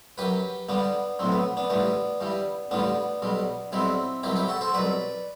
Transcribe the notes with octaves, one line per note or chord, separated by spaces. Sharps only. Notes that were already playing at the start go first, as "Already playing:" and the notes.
F#2 F#3 G4 B4
G2 D3 G3 B3 D4
B1 A2 F#3 C4
B3
B3 D4
A1 G2 E3 B3 D4
G2 E3 G3
A1 G2 D3 G3 B3 D4
B1 B2 G3
B1 B2 G3 C4 E4
C2 B2 F#3 E4 G4
E4 G4
F#4 A4
A4 C5
C2 B2 F#3 B4 D5